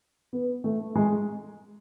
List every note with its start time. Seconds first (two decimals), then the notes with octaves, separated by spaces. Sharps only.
0.33 B3
0.64 A3
0.95 G#3